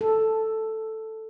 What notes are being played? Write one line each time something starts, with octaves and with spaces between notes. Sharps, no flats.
A4